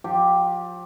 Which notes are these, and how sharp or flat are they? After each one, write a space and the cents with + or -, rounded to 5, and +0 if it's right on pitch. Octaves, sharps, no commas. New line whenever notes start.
F3 +30 G4 +0